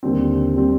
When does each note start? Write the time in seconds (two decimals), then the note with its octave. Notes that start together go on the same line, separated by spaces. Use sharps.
0.03 D#2 D3 G3 C4
0.55 D3 G3 C4